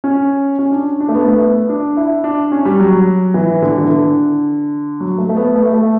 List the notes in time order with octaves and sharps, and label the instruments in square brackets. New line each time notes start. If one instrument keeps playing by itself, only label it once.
[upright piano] C#4
C#4
D4
D4
A3
B3
A3
B3
D4
E4
D4
C#4
G3
F#3
E3
D3
E3
D3
F#3
A3
A3
B3
A3
A3